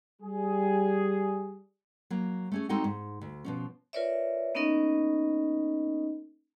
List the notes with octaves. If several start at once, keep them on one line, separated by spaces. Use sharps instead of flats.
G3 G#4
F#3 A#3
A3 C#4 G#4
G#3 C4 D#4 F#4 A4 F#5
G#2
D2
B2 F3 C#4
F4 A#4 B4 C#5 D5 E5
A#3 B3 C#4 D#4 A#4 D#5